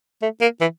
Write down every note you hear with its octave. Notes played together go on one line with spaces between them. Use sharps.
A3
A#3
E3